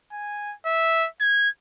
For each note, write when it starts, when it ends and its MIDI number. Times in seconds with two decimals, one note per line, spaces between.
0.12 0.54 80
0.66 1.08 76
1.20 1.49 92